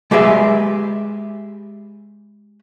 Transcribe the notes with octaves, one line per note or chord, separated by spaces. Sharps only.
G#3 G4 G#4 B4 E5